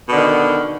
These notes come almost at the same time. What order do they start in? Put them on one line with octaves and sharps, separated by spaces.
B2 D3 D#3